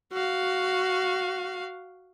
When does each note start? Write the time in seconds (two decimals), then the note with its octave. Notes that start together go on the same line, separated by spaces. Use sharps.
0.13 F#4 F5